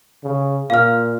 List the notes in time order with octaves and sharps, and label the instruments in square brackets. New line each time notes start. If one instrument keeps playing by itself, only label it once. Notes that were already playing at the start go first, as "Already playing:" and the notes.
[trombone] C#3
[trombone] A#2 [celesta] F5 F6